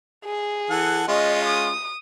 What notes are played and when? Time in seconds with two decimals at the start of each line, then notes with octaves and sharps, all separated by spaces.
0.25 G#4
0.70 E3 A4 F#5
1.08 G#3 C#4 F4 D#5
1.45 D#6